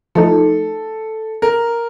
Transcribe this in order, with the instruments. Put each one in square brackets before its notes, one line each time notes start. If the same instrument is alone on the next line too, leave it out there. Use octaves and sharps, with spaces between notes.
[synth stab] F3 A3 D#4 [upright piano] A4
[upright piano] A#4